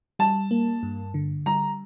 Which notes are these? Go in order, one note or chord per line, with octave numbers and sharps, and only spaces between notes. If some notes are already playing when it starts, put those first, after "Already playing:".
G3 A5
A#3
G2
D3
G3 A#5